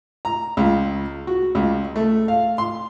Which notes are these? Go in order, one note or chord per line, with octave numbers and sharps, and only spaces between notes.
A#5
C#2
F#4
C#2
A3
F5
C6